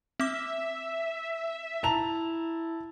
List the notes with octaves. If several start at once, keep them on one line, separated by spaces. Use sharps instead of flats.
C4 E5 D6
E4 A5 A#5 F7